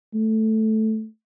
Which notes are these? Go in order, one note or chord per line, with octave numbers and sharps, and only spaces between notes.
A3